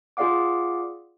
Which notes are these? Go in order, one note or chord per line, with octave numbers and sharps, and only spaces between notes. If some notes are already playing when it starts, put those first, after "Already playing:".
F4 G#4 D5 F5 F#5 D6